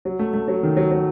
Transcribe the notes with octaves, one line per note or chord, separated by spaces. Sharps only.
F#3
A3
A3
F#3
D#3
F#3
F#3